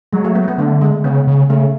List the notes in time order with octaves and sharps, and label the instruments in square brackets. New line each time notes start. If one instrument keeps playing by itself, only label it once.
[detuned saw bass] F#3 [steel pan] G#3
[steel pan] A3
B3
B3
[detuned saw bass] D3 [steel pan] A3
[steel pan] G#3
[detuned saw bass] C#3 [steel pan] B3
[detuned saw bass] C#3
[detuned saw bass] C#3 [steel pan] A3